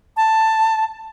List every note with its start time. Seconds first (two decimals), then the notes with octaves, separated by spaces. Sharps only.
0.17 A5